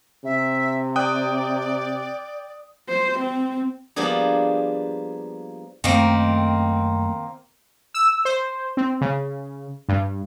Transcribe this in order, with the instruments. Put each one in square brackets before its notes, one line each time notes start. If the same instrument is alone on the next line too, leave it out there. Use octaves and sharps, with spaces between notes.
[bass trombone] C3 [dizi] E5
[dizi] D5 [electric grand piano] G5 D#6 F#6
[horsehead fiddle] C5
C4
[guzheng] F3 G3 A#3 B3 D4 G#4
[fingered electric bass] F#2 A3 [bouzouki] D#3 A#3 C4
[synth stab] E6
C5
C4
C#3
G2